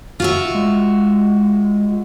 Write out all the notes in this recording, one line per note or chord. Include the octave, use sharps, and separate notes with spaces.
F4 F#4 E5
G#3